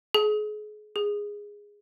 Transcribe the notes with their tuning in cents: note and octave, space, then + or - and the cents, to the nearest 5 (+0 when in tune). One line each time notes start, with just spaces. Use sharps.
G#4 +35
G#4 -10